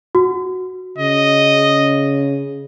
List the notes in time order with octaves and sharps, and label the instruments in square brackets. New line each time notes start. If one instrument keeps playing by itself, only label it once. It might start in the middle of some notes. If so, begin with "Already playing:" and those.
[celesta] F#4
[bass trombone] C#3 [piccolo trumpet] D#5